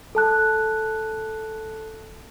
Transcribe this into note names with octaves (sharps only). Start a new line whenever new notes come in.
A4 A5 F#6